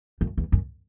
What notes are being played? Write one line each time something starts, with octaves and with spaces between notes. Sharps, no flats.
F#2
E2
F#2